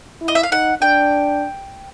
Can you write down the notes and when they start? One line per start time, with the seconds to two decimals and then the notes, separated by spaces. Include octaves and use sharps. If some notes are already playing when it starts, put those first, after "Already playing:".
0.21 E4
0.28 D#5
0.35 E5
0.43 F5
0.52 D#4 F#5
0.82 D4 G5